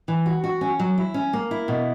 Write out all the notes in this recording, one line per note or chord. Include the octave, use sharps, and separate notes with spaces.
E3
F#4
F#4
C#4
F#3
E4
C#4
A#3
E4
B2